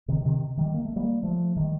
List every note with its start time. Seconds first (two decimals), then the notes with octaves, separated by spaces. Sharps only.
0.08 C3 D#3
0.25 C3 D#3
0.57 D#3 G3
0.74 A#3
0.85 A3
0.96 G3 A#3
1.23 F3 A3
1.57 D#3 G3